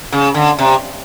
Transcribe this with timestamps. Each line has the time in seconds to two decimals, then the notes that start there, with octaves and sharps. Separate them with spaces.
0.12 C#3
0.34 D3
0.59 C3